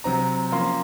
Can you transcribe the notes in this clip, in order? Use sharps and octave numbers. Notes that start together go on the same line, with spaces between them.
C3 F#3 C4 A#5
F3 A#3 C#4 C6